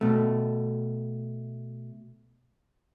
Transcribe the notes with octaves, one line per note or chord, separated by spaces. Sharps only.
B2 A3